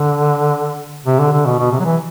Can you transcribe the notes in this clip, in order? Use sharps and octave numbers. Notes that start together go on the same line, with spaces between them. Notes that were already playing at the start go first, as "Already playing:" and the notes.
Already playing: D3
C3
D3
D3
B2
B2
C3
F#3
E3